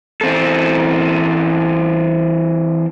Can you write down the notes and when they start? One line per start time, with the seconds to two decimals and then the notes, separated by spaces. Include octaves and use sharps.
0.21 E3 C4 A4